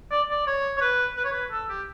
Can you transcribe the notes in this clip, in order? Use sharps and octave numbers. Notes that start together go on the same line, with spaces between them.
D5
D5
C#5
C#5
B4
B4
C#5
B4
A4
G4